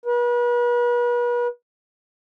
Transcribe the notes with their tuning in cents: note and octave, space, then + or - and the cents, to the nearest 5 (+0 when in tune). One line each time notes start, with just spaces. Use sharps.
B4 -40